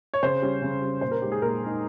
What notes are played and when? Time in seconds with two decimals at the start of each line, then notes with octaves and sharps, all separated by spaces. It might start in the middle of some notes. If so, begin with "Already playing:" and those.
0.14 C#5
0.23 C#3 C5
0.42 G3 C#4
0.62 C#3
0.82 G3 C#4
1.01 A#2 C5
1.11 A#4
1.22 G#3 D#4 G4
1.32 G#4
1.42 A#2 A#4
1.61 G#3 D#4